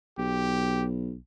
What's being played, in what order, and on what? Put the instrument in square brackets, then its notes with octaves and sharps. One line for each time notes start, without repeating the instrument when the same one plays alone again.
[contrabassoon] B1 [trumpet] G4